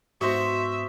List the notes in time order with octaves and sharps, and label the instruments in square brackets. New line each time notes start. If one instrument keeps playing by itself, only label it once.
[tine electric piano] G#2 B3 [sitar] F#4 [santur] C5 D#5 [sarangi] E5